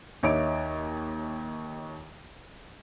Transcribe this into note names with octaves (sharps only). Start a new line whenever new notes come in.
D#2 D#4 C#5 E5 D6 D7